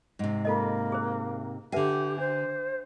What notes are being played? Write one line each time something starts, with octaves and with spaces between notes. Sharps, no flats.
G#2 C3
A#3 F4 A4 D#5
G#4 C5
D3 G4 B4 E5 F#5 G#5
D4 C5